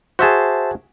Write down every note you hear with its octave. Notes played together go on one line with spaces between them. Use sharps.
F#4 G#4 C5 E5 A5